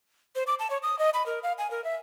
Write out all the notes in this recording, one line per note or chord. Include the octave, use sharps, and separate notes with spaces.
C5
D6
A5
C#5
D#6
D#5
B5
A#4
F5
G#5
A#4
E5